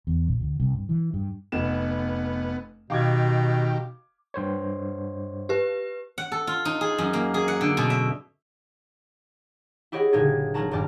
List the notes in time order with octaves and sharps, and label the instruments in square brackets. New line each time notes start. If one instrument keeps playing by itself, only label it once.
[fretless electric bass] E2
A#1
D2
C2
G2
E3
G2
[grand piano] F1 E7 [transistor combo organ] B3
[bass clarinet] B2 [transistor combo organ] D#3 G4 [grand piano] F5 D6 G#6
[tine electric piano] G2 C5 C#5
[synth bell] G4 B4
[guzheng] F#5
A4
F4
D#4
G#4
F#2
A#3
G#4
F#5
D3
B2
E5
[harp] E4 G4 G#4 C#5 D#5 F#5
F#1 A#2 D3 D#4 C#5 G#6
F#3 C#4 D#4 F#4 A5 A#5
D#1 G2 G4 D5 A#5 F6